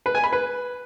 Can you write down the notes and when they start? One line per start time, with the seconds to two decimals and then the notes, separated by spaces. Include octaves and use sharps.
0.06 B4
0.15 G#5
0.24 B5
0.33 B4